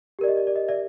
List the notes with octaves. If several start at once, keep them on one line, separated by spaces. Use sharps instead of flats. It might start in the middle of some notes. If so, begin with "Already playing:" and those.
G4 A#4 D5
D#5
D5
D5
D#5
D5 E5